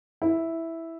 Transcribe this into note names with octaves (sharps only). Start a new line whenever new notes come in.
E4